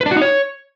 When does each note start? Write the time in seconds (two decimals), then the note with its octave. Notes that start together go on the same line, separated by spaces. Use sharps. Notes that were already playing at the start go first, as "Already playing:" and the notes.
0.01 B4
0.06 D4
0.11 F#4
0.16 D#4
0.22 C#5